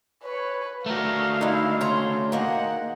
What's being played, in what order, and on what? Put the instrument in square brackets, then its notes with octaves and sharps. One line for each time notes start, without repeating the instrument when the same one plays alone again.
[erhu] B4 [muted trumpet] C#5
[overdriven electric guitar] A3 F#4 [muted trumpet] A#4 [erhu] F5
[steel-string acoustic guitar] G#3 D#4 [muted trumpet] E4
[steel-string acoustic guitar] C#3 C#5 A#5 [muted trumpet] C6
[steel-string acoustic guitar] D#3 A#3 D#5 [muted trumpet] G#4 [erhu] F#5